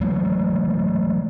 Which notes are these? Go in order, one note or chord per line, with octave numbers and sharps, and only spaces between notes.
E3 F#3 G#3 A3